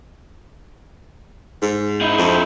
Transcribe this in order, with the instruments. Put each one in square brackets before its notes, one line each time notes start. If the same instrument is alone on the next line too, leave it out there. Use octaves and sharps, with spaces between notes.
[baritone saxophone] G#2
[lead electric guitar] D#4 E4
[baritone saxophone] F2